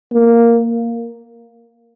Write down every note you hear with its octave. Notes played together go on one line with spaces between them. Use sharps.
A#3